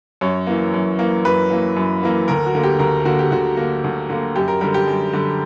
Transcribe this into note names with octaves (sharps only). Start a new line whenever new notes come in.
F#2 C#5
E3 A#3
F#2
E3 A#3
F#2 B4
E3 A#3
F#2
E3 A#3
D2 A#4
F#4
D3 A#3
G4
D2 A#4
D3 A#3 F#4
G4
D2 F#4
D3 A#3
D2
D3 A#3
F#2 G4
A#4
D3 G3 A#4
G4
F#2
D3 G3